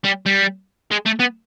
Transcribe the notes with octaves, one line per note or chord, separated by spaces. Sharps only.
G3
G3
G#3
A3
B3